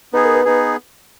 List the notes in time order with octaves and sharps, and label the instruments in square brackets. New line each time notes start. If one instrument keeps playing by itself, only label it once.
[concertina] B3 D#4 G#4 [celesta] B4
[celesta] A#4
B4
[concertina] B3 D#4 G#4 [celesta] B4